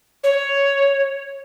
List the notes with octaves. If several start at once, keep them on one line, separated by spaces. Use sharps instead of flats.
C#5